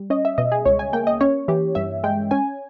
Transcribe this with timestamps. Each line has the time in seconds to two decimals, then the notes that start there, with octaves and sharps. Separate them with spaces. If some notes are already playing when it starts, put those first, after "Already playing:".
Already playing: G3
0.10 C#4 D#5
0.25 E5
0.38 B2 D#5
0.52 G#4
0.65 C#2 C#5
0.79 G#5
0.93 A#3 G5
1.07 D#5
1.21 C#4 C#5
1.48 E3 G4
1.75 G2 E5
2.04 G#3 G5
2.31 C#4 G#5